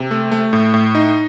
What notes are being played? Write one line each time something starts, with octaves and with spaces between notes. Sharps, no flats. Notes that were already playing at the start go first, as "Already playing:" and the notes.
Already playing: C3
A3
A3
A2
A2
D#4